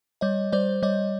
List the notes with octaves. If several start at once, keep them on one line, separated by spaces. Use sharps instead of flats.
G3 C#5 D#5
G3 C5 D5
G3 C#5 D#5